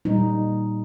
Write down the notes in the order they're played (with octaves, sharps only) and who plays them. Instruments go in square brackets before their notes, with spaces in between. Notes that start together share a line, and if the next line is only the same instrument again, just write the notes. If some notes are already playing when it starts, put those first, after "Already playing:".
[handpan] A#2 G3 A#3 D#4